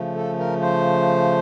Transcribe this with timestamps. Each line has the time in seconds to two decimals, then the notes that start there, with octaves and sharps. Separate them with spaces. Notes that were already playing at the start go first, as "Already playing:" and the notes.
Already playing: C#3 F3 A3
0.16 A4
0.39 A#4
0.61 C5